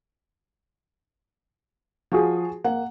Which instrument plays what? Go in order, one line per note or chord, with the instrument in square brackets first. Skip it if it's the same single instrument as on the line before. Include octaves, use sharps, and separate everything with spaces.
[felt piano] F3 [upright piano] F4 F#4 G#4
[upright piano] A#3 [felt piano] F#5